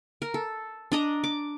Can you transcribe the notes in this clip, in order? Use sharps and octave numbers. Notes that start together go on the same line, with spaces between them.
A#4
A4
D4 D#5 A#5
D6